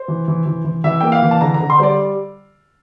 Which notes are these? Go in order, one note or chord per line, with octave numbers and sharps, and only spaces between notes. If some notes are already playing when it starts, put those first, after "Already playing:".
Already playing: C5
E3
E3
E3
E3
E3 E5
A#3 G5
F5
E3
A5
D3 A#5
A#5
D3
C6
G3 C5 D5